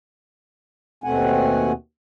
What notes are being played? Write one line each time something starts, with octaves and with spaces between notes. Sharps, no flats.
D#2 B2 A3 C4 F#5 G#5